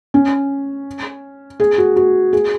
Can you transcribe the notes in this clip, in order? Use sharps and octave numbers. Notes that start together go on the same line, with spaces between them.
C#4
G#4
F#4
F#4
G#4